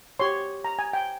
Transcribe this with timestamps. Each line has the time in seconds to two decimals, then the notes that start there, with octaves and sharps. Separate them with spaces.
0.19 G4 C#5 C6
0.65 A#5
0.79 G#5
0.93 G5